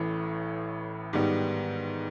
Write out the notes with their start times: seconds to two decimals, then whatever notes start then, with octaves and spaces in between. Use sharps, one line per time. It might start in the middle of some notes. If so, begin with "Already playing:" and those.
Already playing: A1 A2 E3
1.13 G#2 D#3 G3 B3